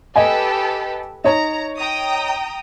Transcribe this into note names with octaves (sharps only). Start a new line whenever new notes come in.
G4 A4 B4 D#5 G5 G#5
D#4 C#5 A#5
G5 A#5 D#6